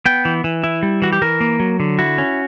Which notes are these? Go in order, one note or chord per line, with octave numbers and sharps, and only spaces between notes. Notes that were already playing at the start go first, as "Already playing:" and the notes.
B3 G5
E3
E3
E4
G3
E3 F#4
G4
E3 A#4
A#3
F#3
D3
E4 F#4
C#4